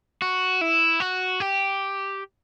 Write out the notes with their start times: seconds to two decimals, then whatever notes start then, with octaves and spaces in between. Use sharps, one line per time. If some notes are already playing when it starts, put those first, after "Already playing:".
0.22 F#4
0.61 E4
1.00 F#4
1.40 G4